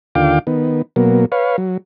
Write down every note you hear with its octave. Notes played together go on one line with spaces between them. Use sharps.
D#2 D3 F4 F5 G5 D6
D#3 B3
B2 F#3 A#3
B4 C#5 F5
F#3